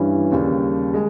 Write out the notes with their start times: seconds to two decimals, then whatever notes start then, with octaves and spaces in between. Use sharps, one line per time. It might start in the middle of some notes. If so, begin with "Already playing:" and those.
Already playing: G2 E3 G3 C#4
0.32 D#2 C#3 G3
0.94 G#3